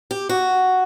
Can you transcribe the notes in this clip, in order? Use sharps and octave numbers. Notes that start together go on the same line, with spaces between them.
G4
F#4